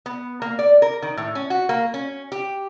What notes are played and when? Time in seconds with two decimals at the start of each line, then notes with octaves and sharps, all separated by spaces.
0.06 B3
0.42 A#3
0.59 D5
0.82 A#4
1.02 D#3
1.17 A2
1.35 C#4
1.50 F#4
1.69 A#3
1.94 C#4
2.32 G4